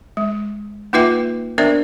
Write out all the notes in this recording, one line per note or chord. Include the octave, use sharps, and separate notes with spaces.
G#3
A#3 D#4 F4 B4 E5 G5
B3 D4 A#4 C5 D5 E5